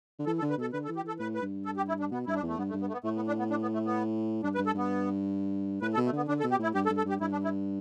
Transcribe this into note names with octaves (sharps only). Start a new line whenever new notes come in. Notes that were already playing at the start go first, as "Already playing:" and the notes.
D3
E3 A4
A4
D3
B4
B2 A4
D3 B4
A4
E3
G4
E3 A4
A2 B4
B4
G2
A4
G4
E4
D4
B2 B3
G2 E4
D4
E2 A3
G2 B3
A3
G2
B3
A3
B3
A2 A3
B3
D4
B3
D4
B3
A3
B3
G2 D4
B4
G2
A4
G2 B3
A2 B4
A4
B2
A3
D3 B3
D3 D4
A4
B2
G4
A2 E4
G2 G4
A4
G2
A4
G2 G4
G2 E4
D4
E4